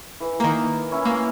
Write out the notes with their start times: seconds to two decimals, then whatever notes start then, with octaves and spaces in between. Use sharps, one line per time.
0.20 E3
0.40 D#3 A#3 A#4
0.91 C#4 E4
1.05 A#3